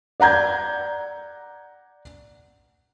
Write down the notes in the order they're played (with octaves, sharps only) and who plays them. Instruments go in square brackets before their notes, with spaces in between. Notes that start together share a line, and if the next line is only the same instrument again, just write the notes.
[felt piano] D5 F#5 A#5 G6 G#6